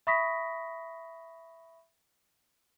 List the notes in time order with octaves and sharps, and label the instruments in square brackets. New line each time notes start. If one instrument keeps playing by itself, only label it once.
[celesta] E5 B5 C#6 D#6 A#6 B6